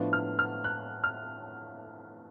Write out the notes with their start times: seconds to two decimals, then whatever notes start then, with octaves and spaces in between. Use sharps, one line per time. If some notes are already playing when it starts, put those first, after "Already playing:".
Already playing: A2 F3 B3 D4
0.13 F6
0.39 F6
0.64 F#6
1.04 F6